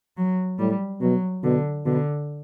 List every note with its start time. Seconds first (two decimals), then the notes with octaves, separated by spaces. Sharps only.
0.17 F#3
0.59 A2 G3
1.01 B2 F#3
1.43 B2 D3
1.86 B2 D3